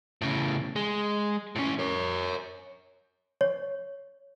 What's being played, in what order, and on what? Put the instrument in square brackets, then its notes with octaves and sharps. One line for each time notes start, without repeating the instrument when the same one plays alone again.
[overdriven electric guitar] A2 C#3
G#3
A2 C#4
A#4 C#5
[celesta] C#5